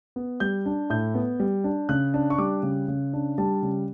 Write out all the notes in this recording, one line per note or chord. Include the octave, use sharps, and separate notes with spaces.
B3
G3 G6
D4
A2 G6
B3
G3
D4
C#3 F#6
D4
C#6
G3 D6
C#3
C#3
D4
G3 A5
C#3